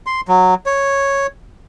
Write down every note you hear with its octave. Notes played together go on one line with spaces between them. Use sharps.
C6
F#3
C#5